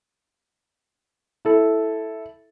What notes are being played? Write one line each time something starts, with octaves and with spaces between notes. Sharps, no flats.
E4 A4